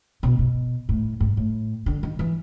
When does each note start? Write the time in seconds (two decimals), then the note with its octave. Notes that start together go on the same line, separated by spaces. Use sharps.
0.23 B2
0.39 B2
0.89 A2
1.20 G#2
1.37 A2
1.86 D3
2.03 D#3
2.19 E3